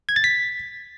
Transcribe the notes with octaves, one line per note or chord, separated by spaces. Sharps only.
G#6
A6
B6